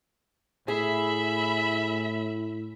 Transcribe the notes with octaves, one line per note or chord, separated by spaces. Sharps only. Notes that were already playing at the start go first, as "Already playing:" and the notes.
A2 G#4 E5 B5